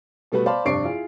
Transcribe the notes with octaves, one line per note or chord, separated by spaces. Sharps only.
B2 G3 A3 B3 F#4 B4
C5 D5 F5 A5 B5 C6
F1 G2 D5 C#6 C7 D7
E4 F4 G#4